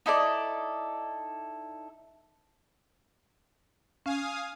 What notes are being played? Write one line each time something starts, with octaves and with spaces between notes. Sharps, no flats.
D#4 E4 A4 D5
C#4 F5 G#5 D#6